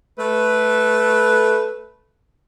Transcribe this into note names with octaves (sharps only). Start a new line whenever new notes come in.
A3 B4